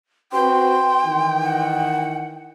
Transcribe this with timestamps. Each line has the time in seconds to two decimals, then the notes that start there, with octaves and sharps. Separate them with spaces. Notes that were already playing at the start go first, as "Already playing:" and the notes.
0.32 C4 F#4 B4 G5 C6
1.04 D#3 E3
1.42 F#5